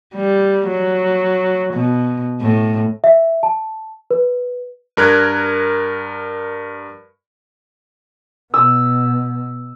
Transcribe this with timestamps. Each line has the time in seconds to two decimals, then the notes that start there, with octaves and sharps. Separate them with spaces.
0.15 G3
0.68 F#3
1.73 B2
2.41 A2
3.04 E5
3.43 A5
4.11 B4
4.97 G2 A#4 F#6 G#6
8.54 B2 E6